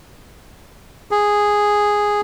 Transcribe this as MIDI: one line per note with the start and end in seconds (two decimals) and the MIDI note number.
1.11 2.21 68